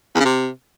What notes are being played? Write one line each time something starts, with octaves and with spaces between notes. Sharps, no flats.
E2
C#3
C3